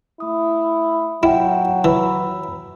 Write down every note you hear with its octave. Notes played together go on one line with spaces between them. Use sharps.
A3 E4 D#6
F#3 E4 F#5 G5
E3 B5 E6